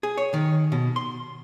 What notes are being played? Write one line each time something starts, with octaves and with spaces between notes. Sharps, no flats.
G#4
C#5
D#3
B2
C6